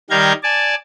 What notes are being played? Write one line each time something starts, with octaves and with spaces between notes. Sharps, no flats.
D#3 G3 F5 A#5 G6 G#6
D5 G#5 A5